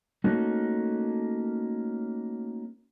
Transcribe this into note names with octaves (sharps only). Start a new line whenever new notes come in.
A3 A#3 C#4 D#4 F#4 A4